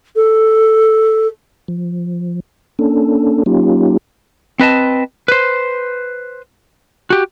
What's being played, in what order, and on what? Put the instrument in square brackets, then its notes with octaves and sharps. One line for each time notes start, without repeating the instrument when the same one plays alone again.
[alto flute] A4
[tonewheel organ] F3
A#3 C#4 D4 A4
F#3 A#3 C#4 D#4 F4 G4
[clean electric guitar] C4 B4 D#5 A5
B4 C5
F#4 G4